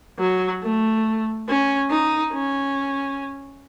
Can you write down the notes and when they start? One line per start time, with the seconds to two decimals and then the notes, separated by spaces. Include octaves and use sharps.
0.19 F#3
0.62 A3
1.48 C#4
1.90 D#4
2.33 C#4